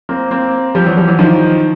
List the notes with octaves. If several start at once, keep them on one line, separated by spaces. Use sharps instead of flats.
A#3 C4
A#3 C4
F3 G3
E3 F#3
F3 G3
E3 F#3
D#3 F3